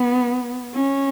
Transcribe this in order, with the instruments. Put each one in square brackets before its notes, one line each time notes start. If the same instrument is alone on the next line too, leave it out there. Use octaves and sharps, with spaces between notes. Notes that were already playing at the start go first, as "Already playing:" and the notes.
Already playing: [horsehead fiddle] B3
C#4